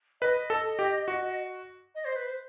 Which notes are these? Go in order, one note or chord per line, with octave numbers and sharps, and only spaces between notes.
B4 D#5
A4
G4
F#4
D#5
C5
B4
C5